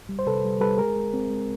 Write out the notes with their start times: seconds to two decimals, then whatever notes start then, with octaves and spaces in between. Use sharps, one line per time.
0.09 G3
0.19 C5
0.26 C3 A4 B4
0.45 G3
0.61 G3 A4 B4
0.78 G#3 G#4 A#4
0.96 G#3
1.13 C4
1.30 G#3